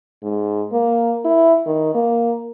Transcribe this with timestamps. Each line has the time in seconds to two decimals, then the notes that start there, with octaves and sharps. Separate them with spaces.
0.23 G#2
0.72 A#3
1.25 E4
1.66 D#3
1.94 A#3